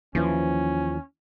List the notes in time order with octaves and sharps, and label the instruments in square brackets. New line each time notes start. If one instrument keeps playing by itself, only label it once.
[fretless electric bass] D#2 E3 [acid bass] F3 [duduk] C#4